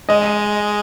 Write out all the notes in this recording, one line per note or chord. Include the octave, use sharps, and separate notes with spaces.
G#3 D#5